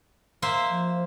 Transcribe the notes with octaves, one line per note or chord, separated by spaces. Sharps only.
A#3 C5 E5
F3